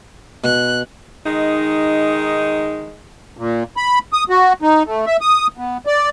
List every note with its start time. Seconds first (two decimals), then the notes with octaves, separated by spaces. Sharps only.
0.44 B2 F#6
1.26 D#3 G#3 D#4
3.37 A#2
3.77 B5
4.13 D#6
4.30 F#4
4.62 D#4
4.86 A3
5.06 E5
5.21 D#6
5.58 B3
5.86 D5